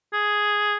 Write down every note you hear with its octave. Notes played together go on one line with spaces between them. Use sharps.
G#4